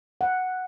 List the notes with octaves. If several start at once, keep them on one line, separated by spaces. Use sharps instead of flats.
F#5